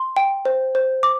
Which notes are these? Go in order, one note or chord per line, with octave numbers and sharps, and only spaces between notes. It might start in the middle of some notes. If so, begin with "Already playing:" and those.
Already playing: C6
G5
C5
C5
D6